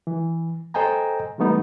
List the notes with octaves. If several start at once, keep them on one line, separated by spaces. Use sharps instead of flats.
E3
A4 C5 D#5 G5 G#5 A#5
E3 G3 A3 B3 D#4